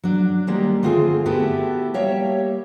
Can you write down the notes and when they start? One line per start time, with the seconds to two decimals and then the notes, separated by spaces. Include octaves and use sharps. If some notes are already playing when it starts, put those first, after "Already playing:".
0.03 F#3 D4
0.47 D#3 G3 G#3 A#3
0.83 D3 A3 C4 F4 G4 G#4
1.26 A3 B3 E4 F#4 G4 A4
1.94 G3 A#3 G4 C#5 E5